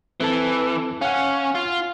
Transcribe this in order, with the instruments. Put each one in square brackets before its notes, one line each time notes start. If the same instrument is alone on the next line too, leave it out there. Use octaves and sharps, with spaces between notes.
[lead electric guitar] E3 [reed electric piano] C4 A4 A5
[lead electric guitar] C#4 [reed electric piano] F5 F#5
[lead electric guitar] F4